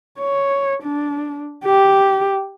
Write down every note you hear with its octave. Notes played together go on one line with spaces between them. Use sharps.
C#5
D4
G4